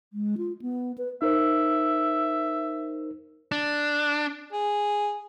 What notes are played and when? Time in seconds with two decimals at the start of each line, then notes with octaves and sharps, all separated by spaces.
0.13 G#3
0.38 F4
0.62 B3
0.98 B4
1.22 D#4 A#4 C5 E5
3.52 D4
4.53 G#4